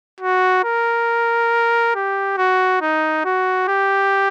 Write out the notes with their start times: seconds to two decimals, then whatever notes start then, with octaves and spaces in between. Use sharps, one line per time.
0.21 F#4
0.64 A#4
1.95 G4
2.38 F#4
2.82 D#4
3.25 F#4
3.68 G4